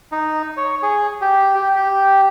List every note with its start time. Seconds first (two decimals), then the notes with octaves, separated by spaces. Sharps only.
0.12 D#4
0.57 C#5
0.83 G#4
1.21 G4
1.55 G4
1.75 G4